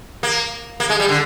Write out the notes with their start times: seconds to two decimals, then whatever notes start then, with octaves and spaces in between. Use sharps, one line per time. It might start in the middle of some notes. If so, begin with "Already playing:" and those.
0.23 A#3
0.80 A#3
0.89 G#3
1.00 G3
1.09 D3